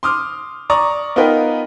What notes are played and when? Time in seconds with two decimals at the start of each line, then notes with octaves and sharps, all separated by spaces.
0.03 C6 D6 D#6 F6
0.70 D5 A#5 C#6 D#6
1.16 B3 D#4 F4 A#4 B4 G5